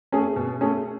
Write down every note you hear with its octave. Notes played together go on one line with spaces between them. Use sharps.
A3 C#4 G#4
B2
A3 C#4 G#4